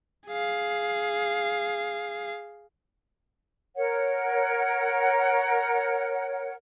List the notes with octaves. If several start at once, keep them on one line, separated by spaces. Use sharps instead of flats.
G#4 F5
A#4 C#5 F#5